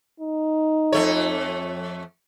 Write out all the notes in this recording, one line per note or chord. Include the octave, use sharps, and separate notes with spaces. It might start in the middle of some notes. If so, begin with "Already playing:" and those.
D#4
F2 A3 C#5